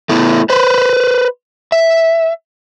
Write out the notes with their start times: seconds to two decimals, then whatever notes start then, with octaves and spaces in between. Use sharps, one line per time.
0.09 A3 B3 E4
0.50 B4 C5
1.72 E5